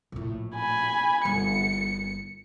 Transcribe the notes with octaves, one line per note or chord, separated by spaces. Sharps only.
A#1 A2
G#5 B5
G1 C#7